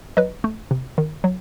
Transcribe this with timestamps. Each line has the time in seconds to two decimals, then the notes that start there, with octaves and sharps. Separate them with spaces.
0.17 F#3 B4 D#5
0.44 A3
0.71 C3
0.98 D#3
1.24 F#3